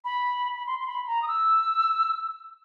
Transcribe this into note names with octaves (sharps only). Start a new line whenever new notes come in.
B5
B5
C6
C6
B5
A#5
D#6
E6